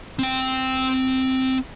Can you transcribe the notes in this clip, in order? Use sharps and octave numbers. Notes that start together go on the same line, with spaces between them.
C4 G5